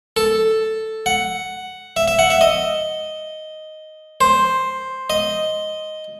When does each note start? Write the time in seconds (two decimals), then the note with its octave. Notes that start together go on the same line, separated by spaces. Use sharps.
0.17 A4
1.06 F#5
1.96 E5
2.08 E5
2.19 F#5
2.30 E5
2.41 D#5
4.21 C5
5.10 D#5